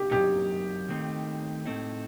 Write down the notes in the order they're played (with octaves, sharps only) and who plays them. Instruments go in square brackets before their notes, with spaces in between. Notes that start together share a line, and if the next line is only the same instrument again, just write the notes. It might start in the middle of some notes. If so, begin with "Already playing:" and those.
Already playing: [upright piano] G4
[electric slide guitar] F#2 F#3 C4 D#4 [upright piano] G4
[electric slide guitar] D#3 A3 C4 D#4
A2 A3 C4 D#4